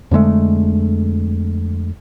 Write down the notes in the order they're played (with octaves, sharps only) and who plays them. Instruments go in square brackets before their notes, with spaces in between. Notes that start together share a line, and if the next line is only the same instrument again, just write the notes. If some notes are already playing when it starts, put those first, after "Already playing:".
[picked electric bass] F2 D3 G#3 A3